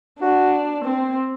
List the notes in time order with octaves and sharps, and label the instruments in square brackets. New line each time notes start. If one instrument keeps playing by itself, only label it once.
[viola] D4 [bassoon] F#4
[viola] C4